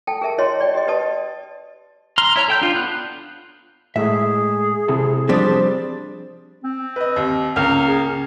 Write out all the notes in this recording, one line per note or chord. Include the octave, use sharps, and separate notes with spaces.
A4 G5 A5
G#4 A#4 E5 A5
E4 F#4 G#4 C#5 D#5 C6
G#4 D5 G5
G4 G#4 D5 D#5
G4 B4 D5 D#5 A5 D#6
A#5 C6 F6
E4 C#5 A#5 F6
A4 G5 G6
D4 F4
B3 F#6
A2 G#3 A3 G#4 E5
C3 E4 A4
F3 G3 C4 D4 A6
C4
B4 D#5
D#2
C#2 A#3 F6
G#4
C#4